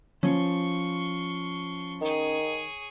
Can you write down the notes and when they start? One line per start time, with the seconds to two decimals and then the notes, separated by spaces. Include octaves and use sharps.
0.23 F3 C#4 C6 C#6
2.02 D#3 G#4 C#5